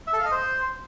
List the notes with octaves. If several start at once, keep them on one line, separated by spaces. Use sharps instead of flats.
E5
A4
F5
D#5
C5